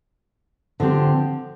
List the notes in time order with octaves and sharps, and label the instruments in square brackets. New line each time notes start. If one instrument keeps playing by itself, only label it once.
[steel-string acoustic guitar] D3 F3 C4 G4